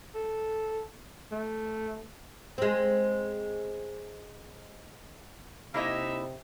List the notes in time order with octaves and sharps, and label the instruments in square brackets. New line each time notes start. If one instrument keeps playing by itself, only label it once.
[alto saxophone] A4
A3
[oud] G#3 C4
[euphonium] C3 [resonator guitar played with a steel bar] A#3 E4 D#5 [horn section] D#4 E5